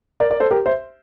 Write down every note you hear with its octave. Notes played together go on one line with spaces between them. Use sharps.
A#4 D5
A#4 D5
A4 C5
G4 A#4
C5 E5